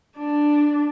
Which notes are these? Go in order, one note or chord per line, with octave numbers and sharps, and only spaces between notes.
D4